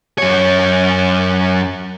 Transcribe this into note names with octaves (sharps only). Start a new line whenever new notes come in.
F#2 C#5